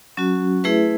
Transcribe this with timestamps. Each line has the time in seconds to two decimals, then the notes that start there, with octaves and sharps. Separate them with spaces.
0.17 F#3 C#4 F#4
0.64 A3 E4 G#4 B4 E5